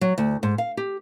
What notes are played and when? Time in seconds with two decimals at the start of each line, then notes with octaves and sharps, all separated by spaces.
0.01 F#3
0.18 D2
0.43 G#2
0.58 F5
0.77 G4